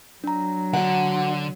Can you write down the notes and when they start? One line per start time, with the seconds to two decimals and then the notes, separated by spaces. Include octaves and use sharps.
0.24 F#3 D4 A#5
0.73 D3 F#4 F#5